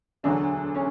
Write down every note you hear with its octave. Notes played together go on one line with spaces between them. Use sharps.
E1 D2 D3 F#3 D4
C#4